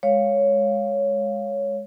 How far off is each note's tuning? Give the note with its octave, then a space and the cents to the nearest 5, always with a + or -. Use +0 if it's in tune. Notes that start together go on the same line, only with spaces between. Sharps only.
G#3 +0 C#5 +0 F5 +0